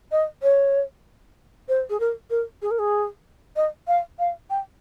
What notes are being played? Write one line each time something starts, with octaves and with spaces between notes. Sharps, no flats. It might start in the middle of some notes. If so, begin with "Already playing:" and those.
D#5
C#5
C5
G#4
A#4
A#4
G#4
A#4
G#4
D#5
F5
F5
G5